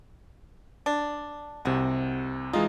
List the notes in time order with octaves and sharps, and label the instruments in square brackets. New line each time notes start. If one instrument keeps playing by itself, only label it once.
[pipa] D4
[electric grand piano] C2 C3 [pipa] G#3 F#4
[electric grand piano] E3 G#3 F4 [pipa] D#4